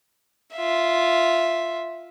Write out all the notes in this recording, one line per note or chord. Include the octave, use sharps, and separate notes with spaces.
F4 E5